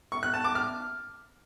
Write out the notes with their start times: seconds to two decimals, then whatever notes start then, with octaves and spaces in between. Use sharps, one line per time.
0.12 C#6
0.23 F#6
0.34 A5
0.44 D6
0.55 F6